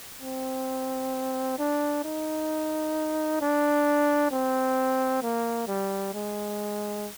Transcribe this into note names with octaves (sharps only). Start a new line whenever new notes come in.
C4
D4
D#4
D4
C4
A#3
G3
G#3